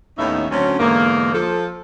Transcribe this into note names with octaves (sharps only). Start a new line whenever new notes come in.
D#2 A2 B3 C#4 D#4 E5
D2 F#3 C4 C#4
E2 G#2 D3 A#3
F3 A4